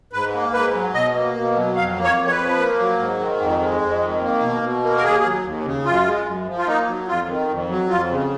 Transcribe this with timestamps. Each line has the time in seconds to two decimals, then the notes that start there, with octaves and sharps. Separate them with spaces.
0.13 G#2 B4
0.33 A#3
0.54 G#2 B4
0.74 F#3
0.94 B2 D#5
1.15 A#3
1.35 B2
1.56 F#3
1.76 F2 F5
1.96 A#3
2.04 C#5
2.17 F2
2.27 C#5
2.31 B4
2.37 F3
2.57 A#3
2.79 F#3
2.98 G#2
3.19 D#3
3.40 F2
3.61 G#3
3.81 F2
4.02 D#3
4.21 A#3
4.42 B2
4.62 B2
4.83 A#3
4.97 A#4
5.03 D#2 G#4
5.23 F#3
5.44 D#2
5.65 C#3
5.85 F#2 F4
6.05 G#3
6.26 F#2
6.47 F3
6.58 F4
6.67 A#3 D#4
6.87 F#3
7.07 F2 F4
7.28 D#3
7.48 F2
7.69 F#3
7.89 F2 F4
8.10 C#3